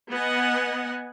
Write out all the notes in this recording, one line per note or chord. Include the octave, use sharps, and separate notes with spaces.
B3 D#5 F#5 G#5